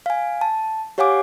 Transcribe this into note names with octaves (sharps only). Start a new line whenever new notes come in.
F5 G#5
A5
G4 C#5 F5 F#5 G#5 D6